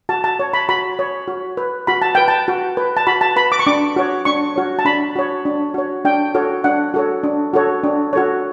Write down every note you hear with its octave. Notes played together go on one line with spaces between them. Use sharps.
F#4 A5
A5
C#5
B5
F#4 B5
C#5
F#4
B4
F#4 B5
A5
B4 G5
A5
F#4
B4
A5
F#4 B5
A5
B4 B5
D6
C#6
D4 D6
F#4 C#5
D4 C#6
F#4 C#5
A5
D4 B5
F#4 C#5
D4
F#4 C#5
D4 G5
F#4 A4 C#5
D4 F#5
F#4 A4 C#5
D4
F#4 A4 C#5
D4
F#4 A4 C#5